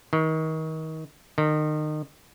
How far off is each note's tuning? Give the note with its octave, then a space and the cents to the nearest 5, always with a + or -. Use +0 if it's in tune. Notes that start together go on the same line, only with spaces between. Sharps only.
D#3 +30
D#3 -30